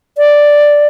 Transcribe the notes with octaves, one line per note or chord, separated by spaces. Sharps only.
D5